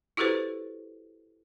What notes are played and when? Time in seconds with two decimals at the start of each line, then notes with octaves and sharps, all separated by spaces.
0.17 E4 F#4 G4 A4 B4 C5